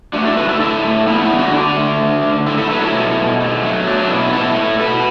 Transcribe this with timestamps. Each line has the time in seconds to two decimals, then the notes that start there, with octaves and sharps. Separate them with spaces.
0.13 A3 D4 F#4
0.25 E4 A4
0.37 D3 F#4 B4
0.49 E4 A4
0.60 D3 E4 A4
0.84 A3
1.07 A3 B3 E4
1.22 B3 E4
1.30 D3
1.38 D4 F#4
1.53 D3 D4
1.77 A3
2.00 D3
2.24 D3
2.46 A3 E4 A4
2.58 E4 A4
2.70 F#3 F#4 B4
2.81 E4 A4
2.94 B2
3.17 B2
3.40 A3
3.63 F#3
3.86 A3 D4
4.00 D4
4.09 B2 B3 E4
4.33 B2 E4 A4
4.57 A3
4.80 B2 F#4 B4